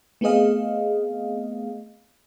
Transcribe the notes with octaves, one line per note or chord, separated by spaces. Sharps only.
A3 B3 C4 G#4 D#5 F5